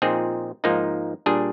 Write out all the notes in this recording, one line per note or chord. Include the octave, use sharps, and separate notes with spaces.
A#2 F3 C4 D#4 G#4
G#2 F3 A#3 D#4
A#2 G3 D4 G#4